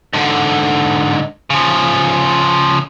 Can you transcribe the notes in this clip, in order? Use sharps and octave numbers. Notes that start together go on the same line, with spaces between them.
G#2 D3
C#3 F3